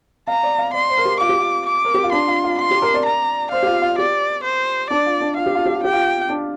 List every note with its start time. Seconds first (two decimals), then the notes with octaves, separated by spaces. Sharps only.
0.27 F5 A#5
0.43 D5
0.58 F5
0.73 D5 C6
0.89 C5
0.97 A#4
1.05 G4
1.20 F4 D6
1.29 G4
1.39 F4
1.66 D6
1.85 A#4
1.94 G4
2.04 F4
2.12 D4 C6
2.28 F4
2.44 F4
2.58 F4 C6
2.71 G4
2.82 A#4
2.94 D5
3.06 A#5
3.52 C5 F5
3.63 G4
3.67 F4
3.82 F4
3.98 G4 D5
4.44 C5
4.90 D4 D5
5.06 F4
5.21 D4
5.37 F4 F5
5.46 G4
5.55 F4
5.66 G4
5.75 F4
5.83 G4 G5
5.93 F4
6.29 D4